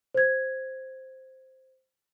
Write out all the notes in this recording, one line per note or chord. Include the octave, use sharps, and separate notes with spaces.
C5 G#6